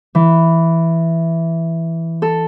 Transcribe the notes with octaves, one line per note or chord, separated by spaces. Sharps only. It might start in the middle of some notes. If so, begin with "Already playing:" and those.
E3
A4